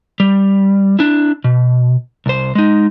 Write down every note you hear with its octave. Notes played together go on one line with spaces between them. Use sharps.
G3
D4 E4
B2
C2 C5
G#3 D#4